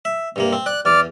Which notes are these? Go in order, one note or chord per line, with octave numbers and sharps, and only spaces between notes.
E5
G2 C3 A#3
C4
D5 F#6
E2 D5 F6